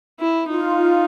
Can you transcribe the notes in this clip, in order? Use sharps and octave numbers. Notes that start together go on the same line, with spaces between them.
E4
D#4 F4